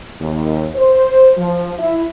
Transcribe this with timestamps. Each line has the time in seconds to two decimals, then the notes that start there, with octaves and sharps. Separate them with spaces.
0.20 D#2
0.75 C5
1.37 F3
1.79 E4